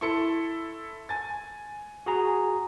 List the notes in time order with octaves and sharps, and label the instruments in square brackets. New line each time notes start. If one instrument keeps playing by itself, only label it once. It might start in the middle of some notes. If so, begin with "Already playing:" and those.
[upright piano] E4 A4 C#7 [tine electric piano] C6 C#6
[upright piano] G#5 A6
[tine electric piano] F#4 G#4 A#5